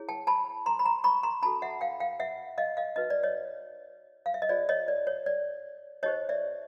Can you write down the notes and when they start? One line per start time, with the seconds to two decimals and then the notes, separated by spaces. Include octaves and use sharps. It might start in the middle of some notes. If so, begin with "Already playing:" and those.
Already playing: E4 G#4 C#5
0.09 G5 A5
0.27 A5 B5
0.66 A#5 C6
0.79 B5
0.85 A#5 C6
1.04 B5 C#6
1.23 A#5 C6
1.42 D4 F#4 A4 A5 B5
1.62 E5 F#5
1.81 F5 G5
2.00 F5 G5
2.19 E5 F#5
2.58 D#5 F5
2.77 D#5 F5
2.96 D#4 F#4 B4 D#5
3.10 D5
3.23 C#5 D#5
4.26 F5
4.34 E5
4.42 D#5
4.49 F4 G#4 C5 D5
4.69 C#5 D#5
4.88 D5
5.07 C#5
5.26 D5
6.03 D#4 G4 C5 C#5 D#5
6.29 D5 E5